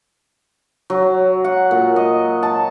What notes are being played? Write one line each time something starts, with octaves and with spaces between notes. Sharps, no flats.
F#3
F#5
A#2
D#5
A5